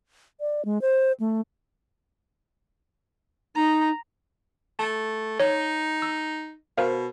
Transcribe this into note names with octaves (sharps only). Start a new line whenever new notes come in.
D5
G#3
C5
A3
D#4 A#5
A3 A5
D#4 C#5
E6
B2 A#4 C5 F5